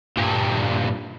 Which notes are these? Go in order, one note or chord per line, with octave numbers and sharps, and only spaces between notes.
G2 A#2